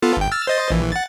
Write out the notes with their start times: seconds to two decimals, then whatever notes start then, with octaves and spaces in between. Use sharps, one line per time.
0.02 B3 F4 A4
0.17 G1 G5
0.32 E6 F6 A6
0.47 C5 D#5 A6
0.70 A#1 E3
0.93 F#5 A6